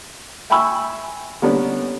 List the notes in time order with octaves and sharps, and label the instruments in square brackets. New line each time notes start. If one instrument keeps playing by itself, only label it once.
[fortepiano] E5 G5 G#5 B5 C#6 E6
D3 G3 A#3 B3 C#4 D4